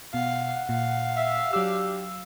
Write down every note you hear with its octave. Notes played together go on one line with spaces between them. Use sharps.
B2 F5 F#5
A#2 F5
E5
F#3 D4 G4 E6